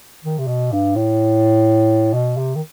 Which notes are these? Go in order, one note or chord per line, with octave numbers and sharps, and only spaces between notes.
D#3
C3
B2
G2
A2
B2
C3
D#3